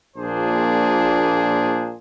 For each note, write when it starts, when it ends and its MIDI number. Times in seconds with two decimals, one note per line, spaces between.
0.17 1.95 34
0.17 1.95 46
0.17 1.95 62
0.17 1.95 68
0.17 1.95 72